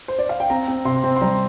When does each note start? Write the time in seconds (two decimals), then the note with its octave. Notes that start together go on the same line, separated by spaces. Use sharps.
0.08 C5
0.19 D5
0.29 F5
0.40 G5
0.50 C4 A#5
0.68 C4
0.85 C3 C6
1.04 C4
1.16 C6
1.21 G3 A#5